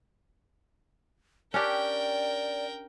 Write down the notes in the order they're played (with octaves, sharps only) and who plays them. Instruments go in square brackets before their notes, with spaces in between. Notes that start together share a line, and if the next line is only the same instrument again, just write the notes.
[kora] C#4 D4 G4 [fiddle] A#4 G5 [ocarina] D5